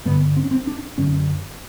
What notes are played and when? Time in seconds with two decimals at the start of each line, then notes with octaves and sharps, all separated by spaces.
0.05 G2 D3 B3
0.36 C4
0.43 C#4
0.51 C4
0.67 D4
0.98 F#2 D3 C#4